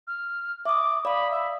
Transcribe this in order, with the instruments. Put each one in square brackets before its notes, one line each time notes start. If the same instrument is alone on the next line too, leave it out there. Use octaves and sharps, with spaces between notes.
[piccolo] F6
[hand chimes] E5 D#6 [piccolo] D6
[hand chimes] D5 F5 D#6 [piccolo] B5
[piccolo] E5